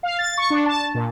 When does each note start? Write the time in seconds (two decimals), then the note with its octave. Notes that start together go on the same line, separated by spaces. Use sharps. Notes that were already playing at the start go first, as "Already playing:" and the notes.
0.03 F5
0.19 A6
0.38 C#6
0.50 D4
0.66 A5
0.94 A#2